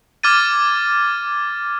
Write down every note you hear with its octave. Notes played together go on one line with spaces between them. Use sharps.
D6 F6 G#6 A6 D#7